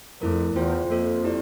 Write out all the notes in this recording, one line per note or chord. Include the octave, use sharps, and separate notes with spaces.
F2 A3 E4 A#4
E2 F4 C5 G5
F2 A#3 F4 A4 C5
E4 G4 D5